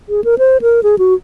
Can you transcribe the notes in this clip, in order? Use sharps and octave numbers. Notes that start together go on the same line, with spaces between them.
G#4
A#4
C5
A#4
G#4
F#4